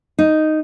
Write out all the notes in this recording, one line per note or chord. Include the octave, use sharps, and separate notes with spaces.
D#4